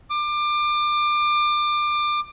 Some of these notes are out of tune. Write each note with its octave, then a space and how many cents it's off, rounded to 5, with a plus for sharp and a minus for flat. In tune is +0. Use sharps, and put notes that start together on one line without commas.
D6 +30